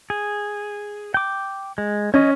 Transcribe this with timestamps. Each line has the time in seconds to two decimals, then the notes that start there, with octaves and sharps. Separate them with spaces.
0.10 G#4
1.14 G5 D6
1.78 G#3
2.14 C#4 C#5 D#5